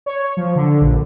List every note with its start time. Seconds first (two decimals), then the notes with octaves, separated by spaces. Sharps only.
0.06 C#5
0.37 F3
0.56 D3
0.81 A#1